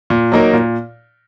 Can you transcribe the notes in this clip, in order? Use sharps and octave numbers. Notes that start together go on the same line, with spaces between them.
A#2
F#3 A#3 D#4 A#4
A#2